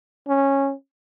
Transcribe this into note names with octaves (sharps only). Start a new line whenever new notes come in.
C#4